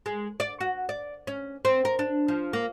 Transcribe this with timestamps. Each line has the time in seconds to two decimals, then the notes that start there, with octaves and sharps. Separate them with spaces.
0.06 G#3
0.40 D5
0.61 F#4
0.89 D5
1.27 C#4
1.65 C4
1.85 A#4
1.99 D4
2.28 F3
2.53 A#3